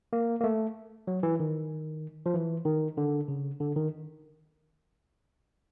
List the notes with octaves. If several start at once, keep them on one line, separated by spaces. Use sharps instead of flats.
A#3
A#3
A3
F#3
E3
D#3
F3
E3
D#3
D3
C#3
D3
D#3